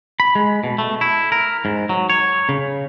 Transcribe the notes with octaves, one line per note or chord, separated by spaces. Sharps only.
B5
G#3
B2
A3
E4
A#4
G#2
F#3
C#5
C#3